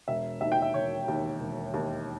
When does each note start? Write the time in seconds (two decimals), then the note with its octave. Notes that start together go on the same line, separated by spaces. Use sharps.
0.08 E1 E5
0.41 D#2 D#3 E5
0.52 G5
0.62 E5
0.74 E1 C#5
1.08 D#2 D#3
1.40 E1
1.74 D#2 D#3